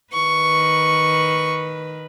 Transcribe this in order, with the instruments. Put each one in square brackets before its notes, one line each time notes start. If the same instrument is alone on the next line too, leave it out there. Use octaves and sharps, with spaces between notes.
[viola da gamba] D#3 B4 [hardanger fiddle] C#6